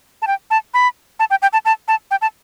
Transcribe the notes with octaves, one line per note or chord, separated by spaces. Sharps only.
A5
G5
A5
B5
A5
G5
G5
A5
A5
A5
G5
A5